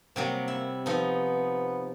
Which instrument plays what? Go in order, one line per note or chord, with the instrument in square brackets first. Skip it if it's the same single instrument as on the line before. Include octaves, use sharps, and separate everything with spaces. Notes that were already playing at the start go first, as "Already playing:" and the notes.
[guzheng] C3 F#3 G3 [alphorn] A#3
[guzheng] E4
[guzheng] F3 D#4 [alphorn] B3